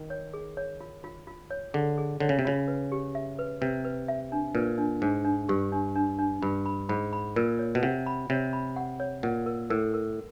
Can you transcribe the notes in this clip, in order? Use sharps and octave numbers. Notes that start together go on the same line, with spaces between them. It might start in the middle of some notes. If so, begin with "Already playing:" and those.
Already playing: D#3
C#5
G#4
C#5
F4
F4
F4
C#5
D3 G#4
G#4
D3 C#5
C#3
C3
C#3 F4
B4
G4
E5
B4
C3 B4
B4
E5
D4
A#2 B4
D4
G#2 D4
D4
G2 G4
D4
D4
D4
G2 B5
B5
G#2 B5
B5
A#2 A#4
C#5
B2
C3 F#5
B5
C3 C#5
B5
F#5
C#5
A#2 F#5
A#4
A2 A#4
A#4